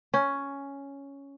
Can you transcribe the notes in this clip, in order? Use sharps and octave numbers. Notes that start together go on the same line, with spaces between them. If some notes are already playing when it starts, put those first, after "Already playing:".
C#4